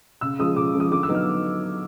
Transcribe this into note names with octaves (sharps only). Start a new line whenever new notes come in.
C#3 E6
F3 G#3 C#4 D#6
C#3 D6
F3 G#3 C#4
D#6
D3 D6
E6
F#3 B3 D#4
F6